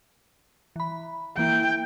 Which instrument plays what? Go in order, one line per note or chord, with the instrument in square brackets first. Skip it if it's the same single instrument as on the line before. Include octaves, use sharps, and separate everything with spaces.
[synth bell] E3 B5
[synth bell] E3 A#3 E4 [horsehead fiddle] G5